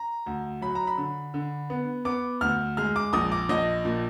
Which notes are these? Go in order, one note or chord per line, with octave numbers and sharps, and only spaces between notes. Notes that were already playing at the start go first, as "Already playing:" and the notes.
Already playing: A#5
D2
F#3 B5
A#5
B5
D3
D3
B3
B3 D6
D2 F6
G#3 F6
D6
A#1 D#6
D6
A#1 D#5
A#2